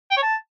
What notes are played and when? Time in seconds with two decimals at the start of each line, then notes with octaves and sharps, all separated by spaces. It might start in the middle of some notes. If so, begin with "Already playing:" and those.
0.11 G5
0.17 C#5
0.23 A5